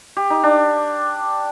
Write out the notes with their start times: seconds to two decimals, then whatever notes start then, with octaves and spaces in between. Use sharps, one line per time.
0.17 G4
0.30 D#4
0.44 D4